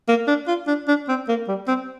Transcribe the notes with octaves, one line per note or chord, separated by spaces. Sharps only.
A#3
D4
F4
D4
D4
C4
A#3
G3
C4